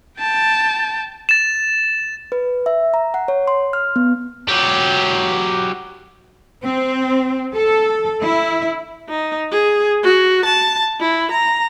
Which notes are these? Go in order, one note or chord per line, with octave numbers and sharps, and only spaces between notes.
G5 A5
A6 E7
B4
E5
A#5
F#5
C#5
C6
F6
B3
F#3 G4
C4
A4
E4
D#4
G#4
F#4
A5
E4
A#5